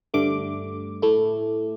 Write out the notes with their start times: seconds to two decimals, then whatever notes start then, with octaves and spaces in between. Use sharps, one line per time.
0.14 G2 D3 A3 D6
1.02 A2 A3 E4